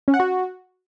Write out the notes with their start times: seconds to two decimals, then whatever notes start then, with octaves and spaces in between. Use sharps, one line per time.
0.08 C#4
0.14 F#5
0.20 F#4